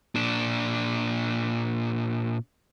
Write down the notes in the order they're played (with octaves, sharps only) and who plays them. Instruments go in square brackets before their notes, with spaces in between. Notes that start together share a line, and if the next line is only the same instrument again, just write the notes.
[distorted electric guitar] A#2 D4